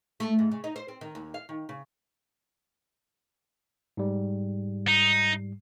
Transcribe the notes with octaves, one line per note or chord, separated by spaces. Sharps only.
A3
G#2
C#3
D#4
C5
C4
D#3
D#2
F5
D#3
C#3
G#2 G3
D#4